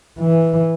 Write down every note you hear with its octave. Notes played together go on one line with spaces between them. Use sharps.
E3